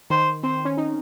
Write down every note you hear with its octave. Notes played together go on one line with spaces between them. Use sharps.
D#3 C5
C4 C5
C#4
D#4